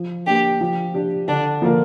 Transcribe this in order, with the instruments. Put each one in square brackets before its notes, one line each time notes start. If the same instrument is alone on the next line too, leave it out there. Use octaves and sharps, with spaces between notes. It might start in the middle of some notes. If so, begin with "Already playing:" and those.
Already playing: [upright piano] F3
[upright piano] A#3 D4 [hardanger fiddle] G4
[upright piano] F3
D4 G4
[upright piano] D3 [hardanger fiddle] D4
[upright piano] F3 A#3 F4 A#4